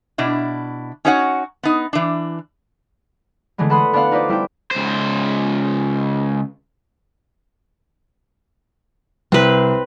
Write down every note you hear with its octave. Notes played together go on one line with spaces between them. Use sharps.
B2 D4 E4
C#4 D#4 F#4 C#5 E5 F#5
B3 D#4
E3 D4
D3 E3 G#3 A3 B3
A4 B4 F#5 B5 C6 D#6
B3 D4 A4 D5 F5 F#5
D#4 F4 B4 C5 D5
G3 E4 A4 G5
C#2 C5
C2 C4 B4